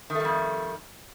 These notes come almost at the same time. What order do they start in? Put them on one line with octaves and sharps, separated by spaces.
D#3 A3 G3 F2